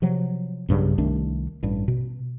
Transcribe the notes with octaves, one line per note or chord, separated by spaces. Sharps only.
C3 F3 F#3
B1 G2 C#3 F#3
C2 D#3 A3 D4
A1 G2
B2